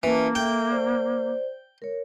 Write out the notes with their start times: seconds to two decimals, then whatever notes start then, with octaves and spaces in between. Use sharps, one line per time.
0.03 E3 A#3 C#4 E4 A5
0.35 A4 E5 G5
0.71 C5 D5
1.82 A#4 C#5